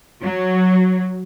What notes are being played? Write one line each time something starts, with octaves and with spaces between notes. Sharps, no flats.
F#3